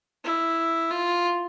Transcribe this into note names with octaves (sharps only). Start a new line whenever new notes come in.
E4
F4